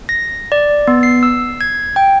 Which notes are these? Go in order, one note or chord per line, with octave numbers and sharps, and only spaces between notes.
A#6
D5
B3
C7
E6
G#6
G5